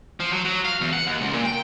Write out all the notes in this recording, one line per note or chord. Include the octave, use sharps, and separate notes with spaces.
F3
F#3
F#3
F5
E2
F#5
D#2
C#2
A#2
G5